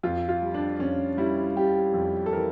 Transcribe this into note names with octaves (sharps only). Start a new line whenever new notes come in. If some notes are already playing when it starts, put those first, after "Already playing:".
F2 F4
F4
G3
D4
F2 C#4
G3 E4
G3 G4
F2
A4
E3 A#4